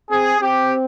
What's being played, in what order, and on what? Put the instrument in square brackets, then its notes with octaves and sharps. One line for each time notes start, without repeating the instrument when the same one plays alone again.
[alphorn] C4 [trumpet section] G#4
[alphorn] C4 [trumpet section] G4